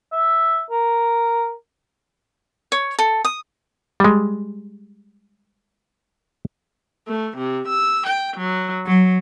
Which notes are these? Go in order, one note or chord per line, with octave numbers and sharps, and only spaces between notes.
E5
A#4
C#5
A4
D#6
G3 G#3
A3
C3
E6
G5
F#3
F#3